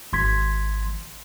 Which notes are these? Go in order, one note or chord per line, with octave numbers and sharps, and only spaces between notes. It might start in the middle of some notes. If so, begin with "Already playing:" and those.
G#1 C6 G#6 B6